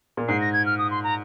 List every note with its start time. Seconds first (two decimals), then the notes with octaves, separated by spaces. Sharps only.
0.17 A#2
0.28 G#2 C7
0.41 A#6
0.53 G#6
0.66 F6
0.78 D#6
0.91 C6
1.04 A#5